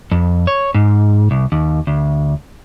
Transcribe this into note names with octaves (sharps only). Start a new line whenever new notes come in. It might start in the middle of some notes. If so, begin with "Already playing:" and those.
F2
C#5
G#2
C2
D#2
D2